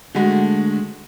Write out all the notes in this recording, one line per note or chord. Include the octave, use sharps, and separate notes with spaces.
D3 G#3 A3 F#4